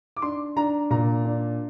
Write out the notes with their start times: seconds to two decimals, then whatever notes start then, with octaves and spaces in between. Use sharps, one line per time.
0.17 D6
0.22 D4 C6
0.56 D4 A#5
0.90 A#2 A#5
1.25 D4